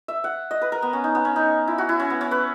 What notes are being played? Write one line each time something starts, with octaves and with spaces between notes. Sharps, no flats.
E5
F#5
D#5
B4
A#4
B3
C#4
D#4
B3
C#4
D#4
E4
F#4
E4
C#4
B3
C#4
B4